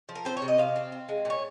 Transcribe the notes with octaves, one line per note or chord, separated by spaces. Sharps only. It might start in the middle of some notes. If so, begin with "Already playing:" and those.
F3
A#4
C4 C5
C#5
C3
D#5
C3 F5
C4
C4
G#3
A#2 C#5